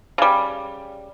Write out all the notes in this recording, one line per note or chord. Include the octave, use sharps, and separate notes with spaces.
C#3 G3